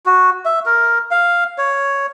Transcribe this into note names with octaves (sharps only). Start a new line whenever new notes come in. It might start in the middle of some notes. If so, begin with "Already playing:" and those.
F#4
E5
A#4
F5
C#5